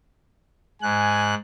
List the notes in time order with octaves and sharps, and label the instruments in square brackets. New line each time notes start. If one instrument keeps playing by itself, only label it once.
[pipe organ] G#2 F#6 [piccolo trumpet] G#5